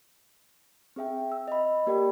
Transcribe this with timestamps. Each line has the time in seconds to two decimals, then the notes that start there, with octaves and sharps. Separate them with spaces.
0.96 C4 G#4 E5 G5
1.32 E6
1.48 D#5 B5
1.87 A#3 G4 A#4 D5 G5 B5